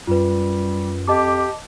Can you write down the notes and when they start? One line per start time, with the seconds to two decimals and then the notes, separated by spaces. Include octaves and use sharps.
0.07 F#2 G3 F4 B4
1.08 F2 G4 D#5 A5 D6